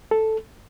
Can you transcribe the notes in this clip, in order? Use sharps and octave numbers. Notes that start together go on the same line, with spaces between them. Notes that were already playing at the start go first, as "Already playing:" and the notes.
A4